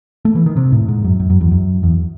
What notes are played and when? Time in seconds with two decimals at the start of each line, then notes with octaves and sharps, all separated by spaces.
0.25 A3
0.35 E3
0.46 D#3
0.56 C3
0.72 A2
0.88 G#2
1.04 F#2
1.20 F#2
1.30 F#2
1.41 E2
1.51 F#2
1.83 E2